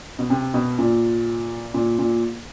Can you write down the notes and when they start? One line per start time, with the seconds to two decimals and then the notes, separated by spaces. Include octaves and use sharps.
0.19 B2
0.30 C3
0.54 B2
0.78 A#2
1.74 A#2
1.99 A#2